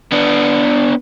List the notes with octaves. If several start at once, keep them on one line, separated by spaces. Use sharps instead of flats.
B3 D4